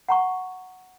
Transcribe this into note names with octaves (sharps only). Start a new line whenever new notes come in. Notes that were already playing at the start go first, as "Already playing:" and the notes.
F#5 A#5 C#6